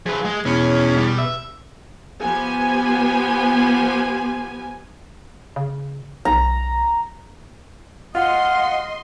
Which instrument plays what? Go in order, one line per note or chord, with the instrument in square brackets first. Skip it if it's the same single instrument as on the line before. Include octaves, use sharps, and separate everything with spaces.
[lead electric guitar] F3 B4 [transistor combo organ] G#4
[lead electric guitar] G#3
[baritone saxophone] E2 [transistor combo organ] B2 [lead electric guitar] C#4
[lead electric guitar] G3
E5
[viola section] F3 B3 G4 G#5
[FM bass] C#3
[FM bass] B1 [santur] A#5
[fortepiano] F4 [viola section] D#5 C6 [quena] F#5